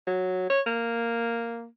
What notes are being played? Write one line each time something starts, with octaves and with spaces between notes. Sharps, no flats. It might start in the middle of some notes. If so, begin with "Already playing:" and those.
F#3
C#5
A#3